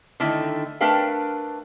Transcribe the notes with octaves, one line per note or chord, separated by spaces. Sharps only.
D3 D#3 A3 D#4 E4
A3 D4 A#4 B4 F5 G5